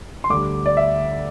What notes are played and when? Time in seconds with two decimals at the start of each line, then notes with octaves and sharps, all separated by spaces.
0.24 C6
0.30 D2 D3 G3 D6
0.66 D5
0.77 E5